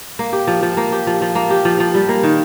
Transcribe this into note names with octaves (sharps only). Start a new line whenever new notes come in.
A#3
G4
F3
F3
A#3
G4
F3
F3
A#3
G4
F3
F3
G3
A#3
D#3